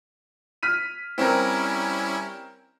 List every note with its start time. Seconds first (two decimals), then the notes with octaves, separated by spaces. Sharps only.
0.63 F6 B6 D#7
1.18 G3 C4 C#4 E4 A#4